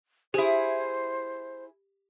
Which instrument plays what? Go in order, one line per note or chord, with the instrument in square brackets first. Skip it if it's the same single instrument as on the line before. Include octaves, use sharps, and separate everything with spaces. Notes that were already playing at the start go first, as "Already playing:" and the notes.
[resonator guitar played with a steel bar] E4 G#4 [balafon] G4 [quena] C5